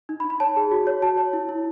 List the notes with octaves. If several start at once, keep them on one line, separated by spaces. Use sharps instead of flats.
D#4
B5
D#4
B5
C#5 A5
G#4
F#4
C#5
F#4 A5
C#5
E4
E4